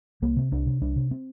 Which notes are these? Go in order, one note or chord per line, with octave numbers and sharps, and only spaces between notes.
C2 A#3
C3 C4
C2 D4
C3
C2 D4
C3
C4